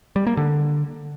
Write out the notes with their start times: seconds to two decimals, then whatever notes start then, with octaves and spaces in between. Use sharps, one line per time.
0.16 G3
0.27 A#3
0.37 D3